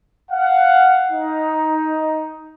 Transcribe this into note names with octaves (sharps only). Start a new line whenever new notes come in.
F5 F#5
D#4